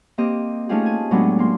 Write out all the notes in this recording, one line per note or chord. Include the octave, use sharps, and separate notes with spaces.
A#3 C4 G4 D#5
A3 C#4 D#4 F4 G4 G#4
G#5
A2 F#3 G#3 B3 D4
A#3 C6